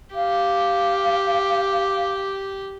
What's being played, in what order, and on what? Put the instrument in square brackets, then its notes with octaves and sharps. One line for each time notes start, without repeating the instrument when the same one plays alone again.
[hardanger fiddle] G4 [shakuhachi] F5